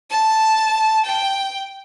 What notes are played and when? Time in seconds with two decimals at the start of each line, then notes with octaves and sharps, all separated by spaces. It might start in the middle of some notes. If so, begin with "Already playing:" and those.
0.11 A5
1.06 G5